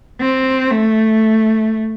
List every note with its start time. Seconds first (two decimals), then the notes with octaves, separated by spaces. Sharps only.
0.21 C4
0.71 A3